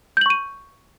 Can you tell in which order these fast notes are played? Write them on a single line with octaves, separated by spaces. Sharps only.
G6 F#7 C#6 D#7